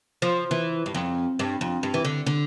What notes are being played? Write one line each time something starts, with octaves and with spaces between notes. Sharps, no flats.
F3
E3
G2
F2
G2
F2
G2
E3
D3
D3